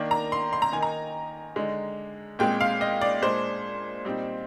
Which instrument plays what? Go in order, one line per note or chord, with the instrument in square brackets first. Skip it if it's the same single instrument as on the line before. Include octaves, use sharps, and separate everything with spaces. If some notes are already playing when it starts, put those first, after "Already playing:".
Already playing: [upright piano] D#3 A#3 D4
A#5
C6
C6
A#5
D#3 A#3 D#4 G#5
A#5
D3 G#3 D#4
A#2 G#3 C4 G5
F5
D#5
D5
A#2 G#3 D4 C5
A#2 G3 C4 D#4